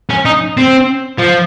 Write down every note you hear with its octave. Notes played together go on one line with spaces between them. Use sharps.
C#4
D#4
C4
F3